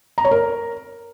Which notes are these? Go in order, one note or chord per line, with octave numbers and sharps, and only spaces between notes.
A#5
C#5
A#4